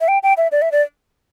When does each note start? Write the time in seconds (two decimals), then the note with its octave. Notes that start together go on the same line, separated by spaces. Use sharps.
0.01 E5
0.08 G5
0.23 G5
0.37 E5
0.52 D5
0.62 E5
0.72 D5